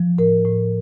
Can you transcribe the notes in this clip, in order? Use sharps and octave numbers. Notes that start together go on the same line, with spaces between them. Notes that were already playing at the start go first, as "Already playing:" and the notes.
Already playing: F3
A2 A#4
A2